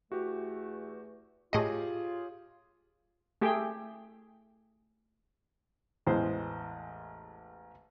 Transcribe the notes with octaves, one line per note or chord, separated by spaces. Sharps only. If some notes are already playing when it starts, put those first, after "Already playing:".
E2 A3 F#4 G4
A2 F4 G4 G#4 C#5 D#5
A3 G4 G#4 G5
A1 E2 G#3 C5